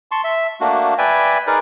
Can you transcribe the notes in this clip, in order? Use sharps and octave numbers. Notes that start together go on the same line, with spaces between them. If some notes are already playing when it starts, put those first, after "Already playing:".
A5 C6 C#6
E5
A3 A#3 D4 F#4
B4 D5 E5 G5 G#5
D#4 G#4 A#4 B4 D5